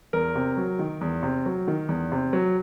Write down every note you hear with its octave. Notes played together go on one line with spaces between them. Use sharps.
E2 A#4
C3
F#3
D#3
E2
C3
F#3
D#3
E2
C3
F#3